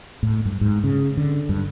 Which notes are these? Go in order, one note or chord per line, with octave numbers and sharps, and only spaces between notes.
A2
G2
G#2
C#3
D3
G2